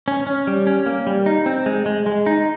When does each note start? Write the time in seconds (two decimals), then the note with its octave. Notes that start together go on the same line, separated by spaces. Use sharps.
0.08 C#4
0.27 C#4
0.47 G3
0.67 C#4
0.86 A#3
1.07 G3
1.26 D#4
1.46 C4
1.66 G#3
1.86 G#3
2.06 G#3
2.26 D#4